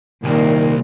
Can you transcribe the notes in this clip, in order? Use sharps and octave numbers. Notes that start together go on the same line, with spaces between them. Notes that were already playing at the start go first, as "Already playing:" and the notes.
C2 A#2 D#3